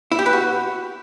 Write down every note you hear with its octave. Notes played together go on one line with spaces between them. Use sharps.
E4
G4
B4
F#4